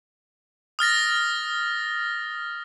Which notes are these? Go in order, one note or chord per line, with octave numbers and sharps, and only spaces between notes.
D#6 F6 A6 A#6